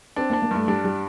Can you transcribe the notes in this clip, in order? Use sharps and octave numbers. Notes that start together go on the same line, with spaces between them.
C4 D4
A#3
D4
A#3
G2 A3
G3 D4
G3